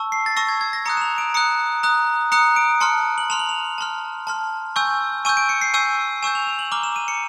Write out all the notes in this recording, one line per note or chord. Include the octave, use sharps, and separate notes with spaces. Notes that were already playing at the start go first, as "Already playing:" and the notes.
Already playing: A5 C#6 E6
C7
A6
A5 C#6 E6 A#6
G#6
G#6
A#6
A#5 D#6 F#6 C#7
E7
F7
D7
A#5 D#6 F#6 C#7
A#5 D#6 F#6
A#5 D#6 F#6 C#7
D7
A5 C6 F6 C#7
F#7
A5 C6 F6 F7
F#7
F7
A5 C6 F6
A5 C6 F6
G#5 C#6 E6 G6
G#5 C#6 E6 G6 D#7
D7
C#7
C7
G#5 C#6 E6 G6 D#7
G#5 C#6 E6 G6 E7
F7
F7
F#7
A#5 D6 F6 G7
E7
D#7
C#7